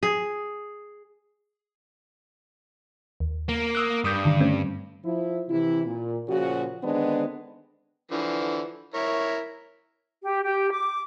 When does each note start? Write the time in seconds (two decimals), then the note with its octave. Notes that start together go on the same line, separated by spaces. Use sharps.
0.03 G#4
3.20 D#2
3.49 A#3
3.75 D#6 E6 F#6
4.04 G2 D6 D#6 G6
4.25 D3 D#3
4.40 A3 C4 C#4
5.04 F3 E4
5.49 C3 E3 E4
5.85 A#2
6.28 A#2 C#3 F3 F#4
6.83 D3 D#3 G#3 B3 C4 D4
8.11 D3 E3 F3
8.94 E4 A#4 C#5
10.23 G4
10.45 G4
10.71 D6